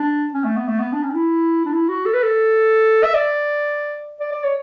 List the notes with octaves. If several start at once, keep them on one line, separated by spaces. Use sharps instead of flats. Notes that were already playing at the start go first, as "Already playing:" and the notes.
Already playing: D4
C#4
A3
B3
A3
B3
D4
C#4
D4
E4
D4
E4
F#4
A4
B4
A4
E5
D5
D5
D5
C#5